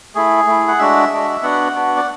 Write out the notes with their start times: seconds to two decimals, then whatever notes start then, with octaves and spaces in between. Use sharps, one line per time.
0.15 A3 E4 G#4
0.47 A3 E4
0.68 F#5
0.79 G#3 D4 F#4 E5
1.10 G#3 D4 F#4
1.43 B3 D4 F#4 F#5
1.75 B3 D4 F#4
1.96 D5